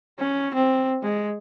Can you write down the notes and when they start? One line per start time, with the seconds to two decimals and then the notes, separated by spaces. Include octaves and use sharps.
0.19 C#4
0.55 C4
1.03 G#3